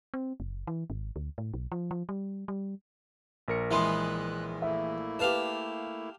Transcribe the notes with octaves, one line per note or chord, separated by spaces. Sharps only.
C4
F#1
E3
G#1
D2
A2
B1
F3
F3
G3
G3
A#1 A#4 C#7
E3 G#3 B3 E4 C6 F#6
A3 A#3 E4 E5
G4 B4 F5 A5